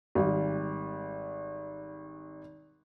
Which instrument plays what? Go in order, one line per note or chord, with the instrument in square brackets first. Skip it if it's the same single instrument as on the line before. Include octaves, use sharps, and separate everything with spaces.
[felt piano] G#1 G3